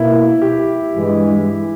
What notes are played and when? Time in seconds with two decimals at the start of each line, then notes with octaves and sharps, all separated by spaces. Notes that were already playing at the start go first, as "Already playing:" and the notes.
Already playing: B2 A#3 E4
0.42 G4
0.95 G2 E3 G#3